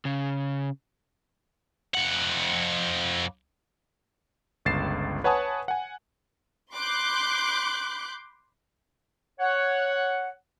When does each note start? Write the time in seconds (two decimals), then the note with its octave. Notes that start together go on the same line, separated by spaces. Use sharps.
0.05 C#3
1.94 F2 F#5
4.65 G1 C#2 A6 C7 E7
5.24 B4 C#5 F#5 G#5 A5 D#6
5.68 F#5 G#5
6.73 B5 C6 D6 F#6 G6
9.40 C#5 F#5